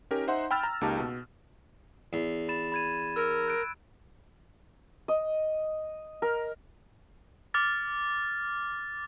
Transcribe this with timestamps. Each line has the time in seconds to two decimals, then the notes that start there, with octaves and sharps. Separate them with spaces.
0.11 C#4 D#4 G4 A#4
0.27 D#4 C5 E5 F#5 C6
0.51 G5 B5 E6 F6 A6
0.63 A#5
0.81 C#2 A#3 D#4 G4 A5
1.00 B2
2.13 E2
2.49 B5 A6 E7
2.72 B5 G#6 D#7
3.16 A#4 E6
3.48 F#6 D7
5.08 D#5
6.22 A#4
7.54 D6 F6 A6